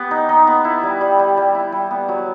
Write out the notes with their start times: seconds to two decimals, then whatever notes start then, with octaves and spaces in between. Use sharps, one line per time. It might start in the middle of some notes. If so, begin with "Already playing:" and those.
Already playing: B3 G4
0.11 D#4
0.29 D#4
0.47 B3
0.65 E4
0.83 G3
1.01 G3
1.19 G3
1.37 G3
1.55 E4
1.72 G3
1.91 B3
2.09 F#3